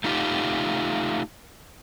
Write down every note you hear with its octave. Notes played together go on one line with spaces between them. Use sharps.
A3 D#4 F4 G4